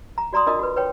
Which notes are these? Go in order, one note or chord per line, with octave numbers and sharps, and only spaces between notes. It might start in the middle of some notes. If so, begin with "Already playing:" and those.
A#5
F#4 D5 A#5 C6 D#6
D4 F4 A#4 D#5 D#6
F#4 B4
B4 C#5 G5